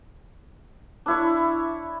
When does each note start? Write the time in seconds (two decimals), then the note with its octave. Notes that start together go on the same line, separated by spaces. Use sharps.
1.06 D4 E4 C#5